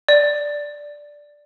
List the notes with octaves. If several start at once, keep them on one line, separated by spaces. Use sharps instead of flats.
D5